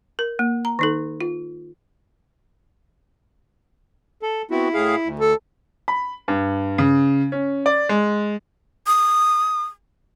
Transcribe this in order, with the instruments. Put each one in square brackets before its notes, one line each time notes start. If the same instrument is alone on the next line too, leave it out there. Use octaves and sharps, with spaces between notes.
[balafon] A#4
A#3
A#5
D#3 D#4 A4
F4
[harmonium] A4
[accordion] B3 C4 F#4 [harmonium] E4
[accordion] A2 G#4 F5
D2
[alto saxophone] A4
[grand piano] B5
G2
C#3
C#4
D5
G#3
[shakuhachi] D#6